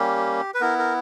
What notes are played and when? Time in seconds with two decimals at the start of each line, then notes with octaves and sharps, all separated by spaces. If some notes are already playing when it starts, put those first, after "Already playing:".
Already playing: G3 A#3 C#4 G4
0.54 B4
0.61 B3 E4 A#4
0.78 A#4